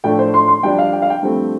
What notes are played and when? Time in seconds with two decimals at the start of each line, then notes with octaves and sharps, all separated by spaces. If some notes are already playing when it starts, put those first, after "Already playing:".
0.04 A2 F3 A3 D4 G5
0.19 C5
0.34 C6
0.48 C6
0.63 G2 F3 D4 G5
0.78 F5
0.93 G5
1.02 F5
1.10 G5
1.23 G2 F3 A3 C4